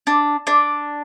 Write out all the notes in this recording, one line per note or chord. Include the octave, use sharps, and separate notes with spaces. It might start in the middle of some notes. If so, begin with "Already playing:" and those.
D4
D4